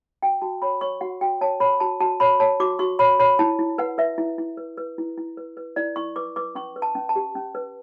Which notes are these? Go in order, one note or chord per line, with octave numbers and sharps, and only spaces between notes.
F#4 G5
F#4 A5
C#5 B5
C#5 C#6
F#4 F#5
F#4 G5
C#5 A5
C#5 B5
F#4 A5
F#4 A5
C#5 B5
C#5 A5
F#4 D6
F#4 C#6
C#5 B5
C#5 B5
E4 A5
E4
B4 F#5
B4 E5
E4
E4
B4
B4
E4
E4
B4
B4
E4 D5
E4 C#6
B4 D6
B4 D6
C#4 C#6
B4
A5
C#4
A5
G4
C#4
B4